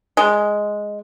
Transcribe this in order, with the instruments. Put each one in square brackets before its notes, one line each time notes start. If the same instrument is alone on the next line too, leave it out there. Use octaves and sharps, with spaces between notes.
[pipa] G#3